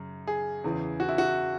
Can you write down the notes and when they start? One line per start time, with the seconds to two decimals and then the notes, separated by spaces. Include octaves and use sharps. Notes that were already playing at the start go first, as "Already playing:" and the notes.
Already playing: F#2 C#3
0.27 G#4
0.64 E2 C#3 E3
1.00 F#4
1.09 E4
1.18 F#4